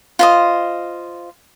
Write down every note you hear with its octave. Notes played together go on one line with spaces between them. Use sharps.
F4 C5 D#5